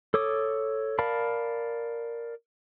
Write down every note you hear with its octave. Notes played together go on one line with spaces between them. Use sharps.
A4 C#5 D6 D#6
A#4 D5 F5 A5 B5